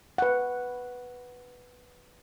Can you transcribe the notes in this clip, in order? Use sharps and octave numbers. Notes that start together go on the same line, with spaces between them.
B4 F#5